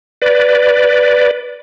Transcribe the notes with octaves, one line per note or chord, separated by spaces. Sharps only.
B4 D5